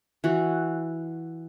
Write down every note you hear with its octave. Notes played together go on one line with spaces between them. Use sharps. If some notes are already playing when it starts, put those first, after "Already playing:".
E3 F#4